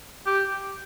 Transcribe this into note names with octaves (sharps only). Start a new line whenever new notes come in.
G4